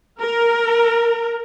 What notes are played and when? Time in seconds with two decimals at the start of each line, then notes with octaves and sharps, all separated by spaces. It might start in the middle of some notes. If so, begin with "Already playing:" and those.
0.20 A#4